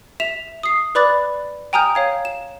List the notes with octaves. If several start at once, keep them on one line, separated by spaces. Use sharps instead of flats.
E5 E7 F7
D#6 C7
B4 D5 B5 D6 F#6 A6
G5 G#5 A#5 D#6 F6 G6
C#5 F5 G#6
E7